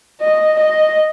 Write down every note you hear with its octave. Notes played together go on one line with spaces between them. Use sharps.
D#5
D#5